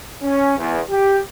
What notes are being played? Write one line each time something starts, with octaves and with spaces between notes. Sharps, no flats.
C#4
E2
G4